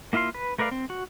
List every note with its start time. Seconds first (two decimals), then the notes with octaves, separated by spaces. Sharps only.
0.13 A#3 E4 F4 F5 C6
0.35 B4
0.58 A3 A#4 B4 D5 F5
0.71 C4
0.90 F#4